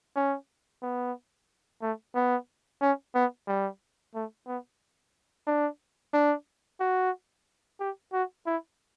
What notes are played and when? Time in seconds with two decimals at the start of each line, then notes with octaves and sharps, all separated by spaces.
0.16 C#4
0.82 B3
1.82 A3
2.16 B3
2.82 C#4
3.15 B3
3.47 G3
4.15 A3
4.47 B3
5.47 D4
6.14 D4
6.80 F#4
7.80 G4
8.13 F#4
8.46 E4